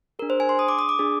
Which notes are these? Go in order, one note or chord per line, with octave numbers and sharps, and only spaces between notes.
D4 G#4 A#4
C5
G#5
C6
D#6
D6
D#6
D6
D4 G#4